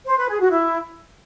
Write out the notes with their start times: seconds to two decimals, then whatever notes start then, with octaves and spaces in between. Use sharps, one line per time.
0.07 C5
0.18 B4
0.29 G#4
0.40 F#4
0.52 E4